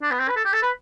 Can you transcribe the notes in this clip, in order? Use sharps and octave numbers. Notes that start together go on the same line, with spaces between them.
D4
B3
C4
B4
A4
G4
A4
B4